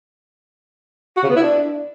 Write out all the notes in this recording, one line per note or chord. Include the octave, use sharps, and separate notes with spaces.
F#4
C#3
B3
E4
D4